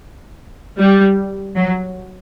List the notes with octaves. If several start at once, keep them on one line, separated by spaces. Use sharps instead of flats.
G3
F#3